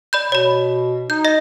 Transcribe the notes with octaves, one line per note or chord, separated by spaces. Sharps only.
D5 B5 G6
B2 C#5 B5
D#4 G6
D#5 A#6